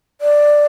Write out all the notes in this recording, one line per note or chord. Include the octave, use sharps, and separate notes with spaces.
D5